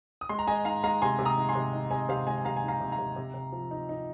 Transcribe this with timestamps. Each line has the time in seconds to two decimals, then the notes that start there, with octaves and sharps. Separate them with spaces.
0.21 D#6
0.29 G#3 C6
0.39 A#5
0.47 G#3 D#5 G#5
0.65 D#4 F5 A#5
0.83 G#3 F5 A#5
1.02 C3 G#5 C6
1.19 C3
1.25 A#5 D#6
1.37 D#4
1.49 G#5 C6
1.56 C3
1.73 D#4
1.91 C3 D#5 G#5
2.09 C3 C5 F5
2.27 G#3 D#5 G#5
2.38 G#5
2.45 C3 F5 A#5
2.56 G#5
2.63 D#4 F5 A#5
2.80 C3
2.92 F5 A#5
2.99 C3
3.16 C3
3.34 C3
3.52 F3
3.71 D#4
3.89 D#4